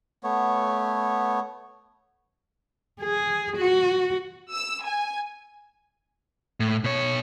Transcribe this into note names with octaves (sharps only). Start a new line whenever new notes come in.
A3 B3 C#5
G#4
F#4
E6
G#5
A2
B2 C#5